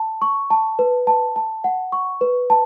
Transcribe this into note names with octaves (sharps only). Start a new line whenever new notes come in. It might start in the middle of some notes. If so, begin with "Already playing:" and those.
Already playing: A5
C#6
A5
B4
A5
A5
F#5
C#6
B4
A5